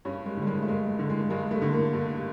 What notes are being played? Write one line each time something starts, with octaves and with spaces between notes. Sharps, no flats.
G2 C#4
G#3
D3 G3
G#3
A3
G2 G#3
D3
G#3
G2 G#3
A3
D3
A#3
G2